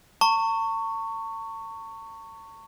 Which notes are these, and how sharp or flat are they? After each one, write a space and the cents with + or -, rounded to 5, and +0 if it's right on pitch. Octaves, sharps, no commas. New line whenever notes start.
A5 +45 C#6 +0